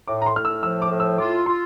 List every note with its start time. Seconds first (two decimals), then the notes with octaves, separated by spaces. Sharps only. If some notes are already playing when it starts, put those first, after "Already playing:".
0.08 A2 D6
0.22 A#5
0.26 C6
0.35 A2 F6
0.45 E6
0.63 F3 E6
0.82 D6
0.90 A2
1.00 E6
1.18 F4 D6
1.46 F4 C6